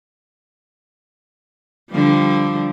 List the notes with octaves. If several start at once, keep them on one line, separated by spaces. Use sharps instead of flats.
D3 F3 G3